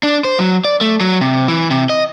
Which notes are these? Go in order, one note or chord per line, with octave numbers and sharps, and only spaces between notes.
D4
C5
F#3
D5
A3
F#3
C3
E3
C3
D#5